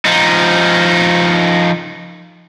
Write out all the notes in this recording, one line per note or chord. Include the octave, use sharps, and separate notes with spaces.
F3 D#4